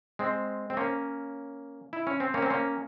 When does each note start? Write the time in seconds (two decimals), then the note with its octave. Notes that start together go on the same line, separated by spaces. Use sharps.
0.19 G#3 C4
0.70 C4
0.77 A#3 C#4
1.93 E4
2.07 C#4
2.20 C4
2.34 A#3 C#4
2.42 C4
2.50 A#3 C#4